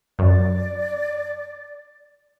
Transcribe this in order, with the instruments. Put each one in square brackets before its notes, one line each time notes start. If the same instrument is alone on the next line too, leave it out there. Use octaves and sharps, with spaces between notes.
[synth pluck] F#2 [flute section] D5